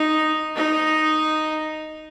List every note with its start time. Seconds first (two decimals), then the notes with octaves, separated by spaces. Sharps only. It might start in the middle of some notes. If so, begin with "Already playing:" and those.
Already playing: D#4
0.57 D#4